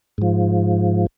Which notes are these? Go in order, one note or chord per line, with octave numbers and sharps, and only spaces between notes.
G#2 F3